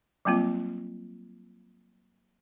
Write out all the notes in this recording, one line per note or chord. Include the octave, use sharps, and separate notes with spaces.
F#3 G3 A#3 C4 F4